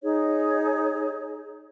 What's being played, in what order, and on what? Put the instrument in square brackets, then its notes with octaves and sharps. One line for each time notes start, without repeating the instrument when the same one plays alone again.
[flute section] D#4 G#4 C#5